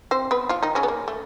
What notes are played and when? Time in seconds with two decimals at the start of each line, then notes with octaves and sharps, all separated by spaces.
0.11 C4 C5
0.31 B3 B4
0.49 F3 F4
0.63 D#3 D#4
0.75 C#3 C#4
0.83 B3
0.88 A#3
1.08 A3